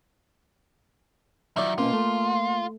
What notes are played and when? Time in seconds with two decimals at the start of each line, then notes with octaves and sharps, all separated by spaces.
1.57 D#3 F3 F#3 E4 C#5 D5
1.78 B2 A#3 C4 C#4 F4 C6
1.93 A3